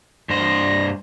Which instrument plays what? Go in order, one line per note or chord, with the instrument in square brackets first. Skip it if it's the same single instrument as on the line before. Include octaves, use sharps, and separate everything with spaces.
[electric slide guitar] G2 C5 [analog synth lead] A#6